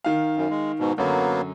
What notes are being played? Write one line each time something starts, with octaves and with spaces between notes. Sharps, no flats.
D#3 F5
F#2
G#3
G#2 B2
F#2 D3 F#3 A#3 B3